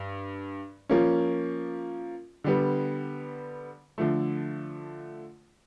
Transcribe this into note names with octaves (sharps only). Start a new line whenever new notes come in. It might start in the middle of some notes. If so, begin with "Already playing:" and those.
Already playing: G2
F3 A#3 C#4
D3 G3 B3
D3 F3 A3